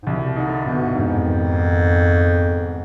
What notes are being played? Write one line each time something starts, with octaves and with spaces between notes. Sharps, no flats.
G#2
C2 B2
D3 D#4
G2 B2
F2 G#2
D#3